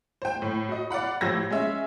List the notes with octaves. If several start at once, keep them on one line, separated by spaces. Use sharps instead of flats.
C5 G5
A2
F#4 D#5
D5 F5 F#5 B5
A2 F3 G4 E6 G#6 A#6
G#3 C#4 E5